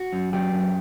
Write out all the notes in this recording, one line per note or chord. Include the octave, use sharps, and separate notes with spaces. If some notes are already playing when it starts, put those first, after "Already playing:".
Already playing: F#4
F#2
F#3 G4
F#2